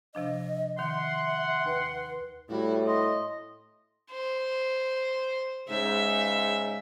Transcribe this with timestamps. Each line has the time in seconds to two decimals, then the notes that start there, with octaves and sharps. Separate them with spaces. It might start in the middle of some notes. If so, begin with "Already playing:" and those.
0.15 C3 F3 D4 D#5
0.79 D#3 E5 F#5 C6
1.66 D#2 B4
2.49 A2 G3 E4 F#4
2.87 D#5 C6
4.12 C5
5.69 G#2 C#3 E5